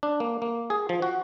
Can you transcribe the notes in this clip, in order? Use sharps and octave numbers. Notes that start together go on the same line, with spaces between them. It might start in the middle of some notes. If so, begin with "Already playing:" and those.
D4
A#3
A#3
G#4
F3
F#4